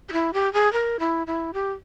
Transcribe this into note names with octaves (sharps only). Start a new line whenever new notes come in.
G4
E4
G4
G#4
A#4
E4
E4
G4